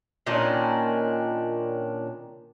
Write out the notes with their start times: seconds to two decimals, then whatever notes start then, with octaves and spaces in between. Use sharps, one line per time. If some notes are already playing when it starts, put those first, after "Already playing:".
0.27 A#2 D#3 C#4 D4